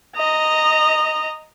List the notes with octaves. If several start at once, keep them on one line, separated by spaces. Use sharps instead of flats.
D#5 A#5